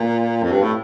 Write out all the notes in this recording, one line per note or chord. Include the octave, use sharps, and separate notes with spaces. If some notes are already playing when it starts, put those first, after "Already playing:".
Already playing: A#2
F2
G2
A2